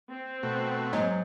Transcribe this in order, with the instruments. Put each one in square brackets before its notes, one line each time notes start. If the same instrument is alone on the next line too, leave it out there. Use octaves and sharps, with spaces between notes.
[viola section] C4
[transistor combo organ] B2 A3 F#4
[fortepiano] G#2 [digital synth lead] F#3